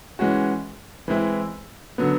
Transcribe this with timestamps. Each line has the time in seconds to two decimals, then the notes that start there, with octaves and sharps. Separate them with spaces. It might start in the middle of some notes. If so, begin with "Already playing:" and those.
0.19 E3 G#3 C#4 F#4
1.08 E3 G#3 C4 E4
1.98 D3 F#3 B3